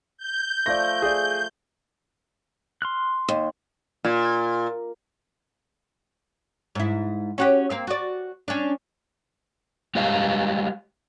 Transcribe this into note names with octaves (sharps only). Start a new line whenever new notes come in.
G6
F3 A3 D5 A#6
G#4 D5
C6 F6 F#6
D#2
A#2
G#2 E4
C#4 F#4 G4
A#3 C4 F5
F#4 D5
C#4 D4
G3 G#3 G4 C#5 D#5 F5